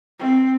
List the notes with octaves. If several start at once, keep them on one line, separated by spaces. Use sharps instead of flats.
C4